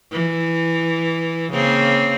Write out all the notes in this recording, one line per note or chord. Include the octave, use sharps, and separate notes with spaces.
E3
C#3 A#3 C4